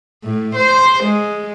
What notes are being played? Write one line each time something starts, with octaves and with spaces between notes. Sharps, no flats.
A2
C5
G#3